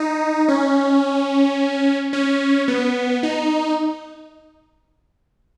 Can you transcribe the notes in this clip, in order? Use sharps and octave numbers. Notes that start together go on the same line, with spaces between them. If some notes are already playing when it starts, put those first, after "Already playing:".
Already playing: D#4
C#4
C#4
B3
D#4